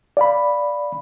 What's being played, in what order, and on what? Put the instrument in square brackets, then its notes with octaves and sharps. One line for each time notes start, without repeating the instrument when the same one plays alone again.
[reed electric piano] D5 F5 B5